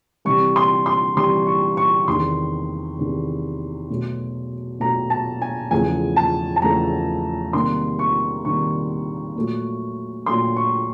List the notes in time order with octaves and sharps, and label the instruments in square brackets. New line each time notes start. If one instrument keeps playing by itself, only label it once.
[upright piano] C3 E3 G3 C#6
C6
C6
C3 E3 G3 C6
C#6
C#6
E2 C3 D#3 C6
E2 C3 D#3
B2 F#3 A3
B2 F#3 A3 A#5
A5
G#5
E2 C#3 F3 A3 G#5
A5
A5
E2 C#3 F3 A3 A#5
C3 D#3 G3 A#3 C6
C#6
C3 D#3 G3 A#3 C#6
A#2 F#3 A3
A#2 F#3 A3 C6
C#6